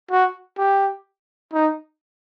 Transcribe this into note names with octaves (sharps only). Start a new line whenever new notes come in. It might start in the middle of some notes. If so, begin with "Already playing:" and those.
F#4
G4
D#4